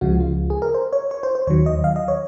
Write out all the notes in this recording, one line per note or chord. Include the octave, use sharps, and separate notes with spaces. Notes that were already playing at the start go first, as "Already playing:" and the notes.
C#2 C#3 F3 G#3 F#4
F4
G#4
A#4
C5
C#5
C#5
C5
C5
D#2 D#3 F#3 C#5
D#5
F5
D#5
C#5